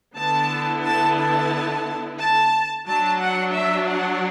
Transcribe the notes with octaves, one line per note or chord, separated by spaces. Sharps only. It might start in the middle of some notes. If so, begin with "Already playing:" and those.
D3 B3 E4 A5
A5
A5
A5
F#3 D4 A5
F#5
E5
F#5